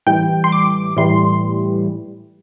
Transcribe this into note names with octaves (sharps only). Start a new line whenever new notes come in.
A2 E3 G3 G5
C6
D6
A2 E3 G3 C6